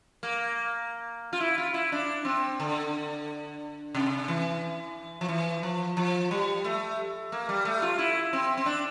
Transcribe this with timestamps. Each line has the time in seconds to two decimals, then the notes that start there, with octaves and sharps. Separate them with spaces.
0.23 A#3
1.33 F4
1.40 E4
1.58 F4
1.74 E4
1.92 D4
2.25 C4
2.60 D3
3.95 C3
4.28 E3
5.21 F3
5.29 E3
5.63 F3
5.97 F3
6.31 G3
6.64 A3
7.32 A#3
7.49 G3
7.65 A3
7.82 F4
7.99 E4
8.33 C4
8.57 C4
8.66 D4